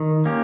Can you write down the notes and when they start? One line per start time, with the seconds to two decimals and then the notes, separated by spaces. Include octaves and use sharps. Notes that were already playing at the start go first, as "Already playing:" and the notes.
Already playing: D#3
0.25 A#3 C#4 G4